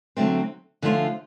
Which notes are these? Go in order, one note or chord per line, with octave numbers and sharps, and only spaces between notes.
D3 F#3 A3 C4
D3 F3 A3 C#4 F4